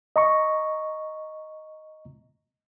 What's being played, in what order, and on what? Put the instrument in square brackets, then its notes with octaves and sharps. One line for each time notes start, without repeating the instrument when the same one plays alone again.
[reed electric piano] D#5 A#5 C#6